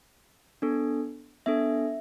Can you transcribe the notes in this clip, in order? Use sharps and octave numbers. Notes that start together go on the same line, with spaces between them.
B3 D4 A4
B3 D4 A4 E5